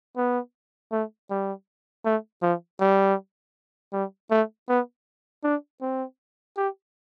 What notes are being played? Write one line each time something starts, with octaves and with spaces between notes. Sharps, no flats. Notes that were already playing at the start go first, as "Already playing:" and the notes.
B3
A3
G3
A3
F3
G3
G3
A3
B3
D4
C4
G4